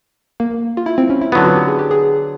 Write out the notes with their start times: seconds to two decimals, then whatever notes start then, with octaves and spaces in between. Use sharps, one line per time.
0.40 A#3
0.77 F4
0.86 E4
0.98 C4
1.10 C#4
1.21 E4
1.32 D3 F#3 B3 F4
1.44 F#4
1.56 G4
1.68 G#4
1.79 G4
1.91 G#4